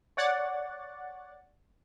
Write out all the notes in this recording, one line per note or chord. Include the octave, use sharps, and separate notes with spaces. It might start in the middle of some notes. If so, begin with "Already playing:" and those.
C#5 D5 F#5 A6